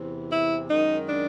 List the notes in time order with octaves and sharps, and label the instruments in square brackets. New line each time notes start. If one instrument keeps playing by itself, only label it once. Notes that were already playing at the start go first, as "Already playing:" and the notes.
Already playing: [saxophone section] E2 C3 E3
E4
F#2 D#3 G#3 D#4
D4